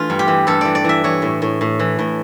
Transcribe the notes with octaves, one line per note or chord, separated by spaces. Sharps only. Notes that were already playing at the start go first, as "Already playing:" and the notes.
Already playing: E3 A3 D4 F4
G2
G4
E3
G2 A4
E3 D5
D5
E3 E5
E3 C#5
A2
A2
A2
E3
A2